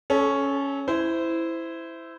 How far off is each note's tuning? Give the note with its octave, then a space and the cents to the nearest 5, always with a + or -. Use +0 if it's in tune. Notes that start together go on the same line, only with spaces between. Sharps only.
C#4 +0 A4 -25
E4 +0 C5 -20